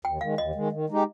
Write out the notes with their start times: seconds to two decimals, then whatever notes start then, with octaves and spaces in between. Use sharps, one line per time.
0.05 D#2 G5
0.21 D#3 G#3 F5
0.38 D#2 D#5
0.55 D#3 G#3
0.72 D#3
0.90 G#3 D#4 G4